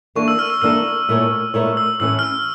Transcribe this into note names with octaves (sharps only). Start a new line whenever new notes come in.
E3 A#3 D4 A4 C#6
E6
F6
E6
E3 A#3 D4 A4 E6
A#2 A3 E4 A#4 C#5
A#2 A3 E4 A#4 C#5
E6
A2 E3 A3 C#4 E6
F6
E6